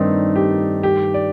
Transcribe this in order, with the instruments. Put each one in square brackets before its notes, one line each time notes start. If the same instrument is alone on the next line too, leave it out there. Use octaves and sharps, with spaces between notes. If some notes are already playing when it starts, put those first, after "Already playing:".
Already playing: [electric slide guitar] G2 D#3 A3 [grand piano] C4 D4 D#4 A#4
[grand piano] G4
G4
D5